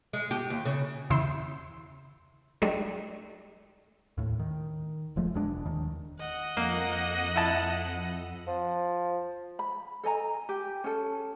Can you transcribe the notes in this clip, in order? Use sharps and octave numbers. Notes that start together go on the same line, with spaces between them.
G#3
G4
D#2
C#3
E2 C#3 E4 C6 E6 G6
F#3 G#3 A3 D4 D#4 G4
D#2 A2
D#3
E1 F3 G#3 A3
E1 E2 G#3 D4
D#2 D#3
D#5 F#5
F2 A#3
E4 A5
F3
B5
A4 D#5 G#5 A#5
G4
C#4 A4